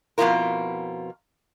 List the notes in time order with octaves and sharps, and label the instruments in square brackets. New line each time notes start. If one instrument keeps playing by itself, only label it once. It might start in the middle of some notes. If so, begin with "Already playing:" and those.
[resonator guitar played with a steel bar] F2 B2 E3 E4 F4 A#4